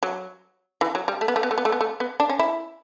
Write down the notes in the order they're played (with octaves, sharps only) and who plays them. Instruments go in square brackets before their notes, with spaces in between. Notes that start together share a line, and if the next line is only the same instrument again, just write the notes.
[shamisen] F#3
E3
F#3
G3
A3
B3
A3
B3
A3
B3
A3
B3
A3
B3
D4
C#4
E4